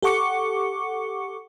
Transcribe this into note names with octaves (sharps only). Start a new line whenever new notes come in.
G4 A4 F#5 C#6 D6 C#7